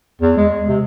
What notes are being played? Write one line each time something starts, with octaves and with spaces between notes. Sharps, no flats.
E2
G#3
C3